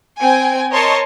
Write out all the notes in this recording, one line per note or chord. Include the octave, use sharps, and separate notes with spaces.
C4 G5 G#5
A#4 C#5 D#5 A5 C6 C#6